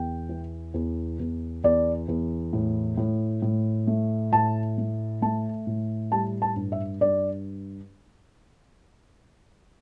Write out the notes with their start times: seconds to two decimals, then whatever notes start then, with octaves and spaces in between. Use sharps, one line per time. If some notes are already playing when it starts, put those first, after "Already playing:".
Already playing: E2 G5
0.29 E3
0.74 E2
1.19 E2
1.64 E2 D5
2.08 E2
2.53 A2
2.97 A2
3.42 A2
3.87 A3
4.33 A2 A5
4.78 A3
5.22 A3 A5
5.67 A2
6.12 G3 A5
6.42 A5
6.56 G2
6.72 E5
7.01 G2 D5